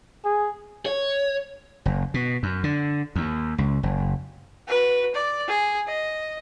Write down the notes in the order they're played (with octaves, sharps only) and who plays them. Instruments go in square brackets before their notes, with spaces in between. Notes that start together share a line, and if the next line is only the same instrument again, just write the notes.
[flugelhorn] G#4
[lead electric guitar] C#5
[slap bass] F#1
B2
F#2
D3
D#2
C#2
F#1
[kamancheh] F#4 B4
D5
G#4
D#5